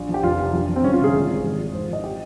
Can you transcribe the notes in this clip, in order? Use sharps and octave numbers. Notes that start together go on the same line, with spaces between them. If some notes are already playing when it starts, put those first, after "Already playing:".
Already playing: A#1
F3
G4
F1 F4
C3
A#1
F3
C4
G1 C#4
F4
C3
G#4
G#1
F3
G#1
F3
G#1 C5
F3 D#5
G4